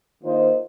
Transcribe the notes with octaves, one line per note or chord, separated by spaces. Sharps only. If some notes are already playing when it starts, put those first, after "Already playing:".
D#3 A#3 F4 C5 D#5